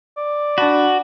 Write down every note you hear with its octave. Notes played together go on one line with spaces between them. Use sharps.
D5
D4 F#4 A5 B5